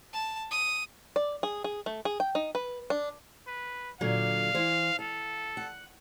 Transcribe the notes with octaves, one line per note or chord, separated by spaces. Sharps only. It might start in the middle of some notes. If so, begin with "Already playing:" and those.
A5
D#6
D5
G#4
G#4
A3
G#4
G5
D#4
B4
D4
B4
A#2 D3 F#3 F5
E3 C5
A4 F5
F#5